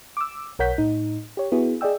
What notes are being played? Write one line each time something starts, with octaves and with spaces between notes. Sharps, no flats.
D6 E6
B1 A#4 C#5 F#5 G6 B6
A2 D#4
G4 C#5
B3 E4 F#4 G#4
G#4 D5 D#5 G5 E6